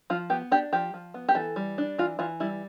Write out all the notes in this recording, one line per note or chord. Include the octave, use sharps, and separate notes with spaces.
F3 F4
B3 G4
D4 G4
F3 G4
F3
B3
G4
E3 A4
G3
D4
E3 F4
E3 F4
G3 E4